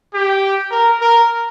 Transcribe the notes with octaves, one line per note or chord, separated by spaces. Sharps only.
G4
A#4
A#4